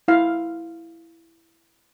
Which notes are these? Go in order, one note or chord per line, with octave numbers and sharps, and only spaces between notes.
E4 F5